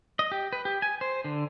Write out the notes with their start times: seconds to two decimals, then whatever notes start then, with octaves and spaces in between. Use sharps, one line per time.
0.19 D#5
0.32 G4
0.53 B4
0.65 G4
0.82 G#5
1.01 C5
1.24 D3